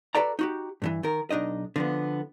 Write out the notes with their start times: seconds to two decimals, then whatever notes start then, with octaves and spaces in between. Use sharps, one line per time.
0.15 F#4 A4 B4 D5 A#5
0.39 D#4 F#4 G4
0.82 G2 C#3 E3
1.03 D#3 A#4
1.31 B1 D4 D#4 D#5
1.76 D3 F3 B3